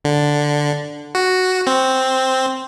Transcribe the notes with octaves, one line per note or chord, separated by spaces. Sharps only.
D3
F#4
C4